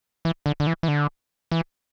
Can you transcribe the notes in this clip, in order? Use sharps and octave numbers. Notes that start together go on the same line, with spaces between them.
E3
D3
D3
E3
E3
D3
E3